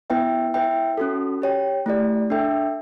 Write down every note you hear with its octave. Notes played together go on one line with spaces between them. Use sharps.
B3 E4 B4 E5 G5
E4 B4 E5 G5
C#4 F#4 A4
G4 C#5 G5
A3 E4 G4 D5
D4 A4 E5 G5